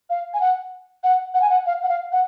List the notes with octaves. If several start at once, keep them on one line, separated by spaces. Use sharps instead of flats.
F5
G#5
F#5
F#5
F#5
G#5
F#5
F5
F#5
F5
F#5